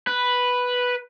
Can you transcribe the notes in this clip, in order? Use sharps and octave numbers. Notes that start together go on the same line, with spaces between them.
B4